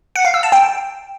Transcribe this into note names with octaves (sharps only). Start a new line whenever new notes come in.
F#5
F5
E6
A5
G5